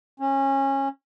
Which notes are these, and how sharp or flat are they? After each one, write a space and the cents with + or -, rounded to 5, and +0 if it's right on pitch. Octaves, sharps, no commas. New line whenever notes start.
C#4 -25